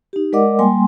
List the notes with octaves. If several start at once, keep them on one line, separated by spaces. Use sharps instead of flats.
D#4 G4
G#3 A#4 D5 D#5 F#5 D6
G3 A#3 G5 G#5 C6